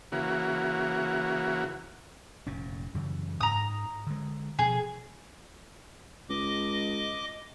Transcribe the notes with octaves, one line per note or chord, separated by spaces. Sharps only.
C#3 E3 A#3 F#4
F1 A#2 C#4
F#2 C#3 E3
G#2 A#5 D#6
D3 G#3
B2 F3 G#4
C#2 D#5 D6